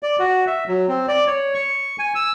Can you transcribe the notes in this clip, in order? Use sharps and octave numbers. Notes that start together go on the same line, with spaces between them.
D5
F#4
E5
F#3
C4
D5
C#5
C#6
G#5
E6